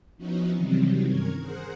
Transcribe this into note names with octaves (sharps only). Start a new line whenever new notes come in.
F3 B3 C#4 D#4 E4 F#4
C3 D#3 E3 F#3 G3 C4
G2 C#4 A#4 C#5 G#6
G#4 A#4 C5 F#5